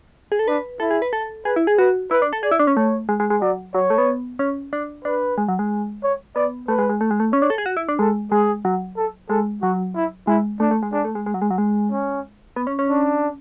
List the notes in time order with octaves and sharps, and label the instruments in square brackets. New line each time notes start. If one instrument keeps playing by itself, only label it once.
[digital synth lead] G#4
A4
[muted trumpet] D4 [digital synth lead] B4
[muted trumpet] E4 [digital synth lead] A4
[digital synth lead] G#4
B4
A4
[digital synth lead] G#4 [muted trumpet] B4
[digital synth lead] E4
G#4
[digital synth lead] F#4 [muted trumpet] B4
[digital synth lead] E4 [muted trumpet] B4
[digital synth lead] D4
A4
[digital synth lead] G#4 [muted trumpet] D5
[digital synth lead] E4
D4
C#4
[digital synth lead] A3 [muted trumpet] C#5
[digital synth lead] G#3
G#3
G#3
[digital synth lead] F#3 [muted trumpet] D5
[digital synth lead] F#3 [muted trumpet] C#5
[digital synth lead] A3
B3
C#4
D4
[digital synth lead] D4 [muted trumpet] B4
[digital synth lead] G#3
F#3
G#3
[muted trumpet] C#5
[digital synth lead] B3 [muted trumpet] D5
[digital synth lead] A3 [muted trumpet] B4
[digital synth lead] G#3
G#3
A3
G#3
A3
[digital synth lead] C#4 [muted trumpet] C#5
[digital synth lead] D4
A4
G#4
F#4
E4
D4
[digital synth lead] G#3 [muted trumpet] A4
[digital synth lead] G#3 [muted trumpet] G#4
[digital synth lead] F#3
[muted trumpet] A4
[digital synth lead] G#3 [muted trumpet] A4
[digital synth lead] F#3 [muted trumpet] F#4
[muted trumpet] E4
[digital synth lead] G#3 [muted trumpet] E4
[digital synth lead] A3 [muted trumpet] D4
[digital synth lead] A3
G#3
[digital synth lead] G#3 [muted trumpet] D4
[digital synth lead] A3
G#3
G#3
F#3
G#3
F#3
G#3
[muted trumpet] C#4
[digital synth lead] B3
C#4
C#4
[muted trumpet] D4